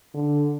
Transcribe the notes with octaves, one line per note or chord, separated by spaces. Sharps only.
D3